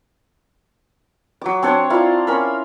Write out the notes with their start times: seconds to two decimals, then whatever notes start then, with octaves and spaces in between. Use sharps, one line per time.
1.41 F#3 D6
1.63 C4 D4 C#5
1.90 E4 F4 D5 A#5
2.27 C#4 A#4 B5